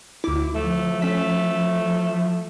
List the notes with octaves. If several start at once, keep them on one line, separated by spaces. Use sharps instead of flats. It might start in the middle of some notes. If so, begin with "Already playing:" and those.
D2 E4 D6
F3 A3
A3 C#4 B6